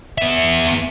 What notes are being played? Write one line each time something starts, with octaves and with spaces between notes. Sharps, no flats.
B3 E5